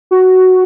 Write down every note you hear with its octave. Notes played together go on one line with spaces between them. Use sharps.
F#4